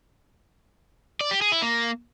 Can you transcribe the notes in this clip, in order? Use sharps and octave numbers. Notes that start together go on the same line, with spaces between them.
D5
G4
G#4
E4
A#3